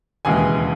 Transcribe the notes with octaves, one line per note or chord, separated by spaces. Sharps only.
E1 D#2 C#3 E3 G#3 G#5